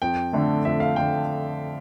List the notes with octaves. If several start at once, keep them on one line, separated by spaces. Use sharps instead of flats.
F2 G5
D3 A3 D4
F2 E5
F5
D3 A3 D4 G5